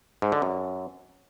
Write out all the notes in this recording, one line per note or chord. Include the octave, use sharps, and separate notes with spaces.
G#2
D3
F#2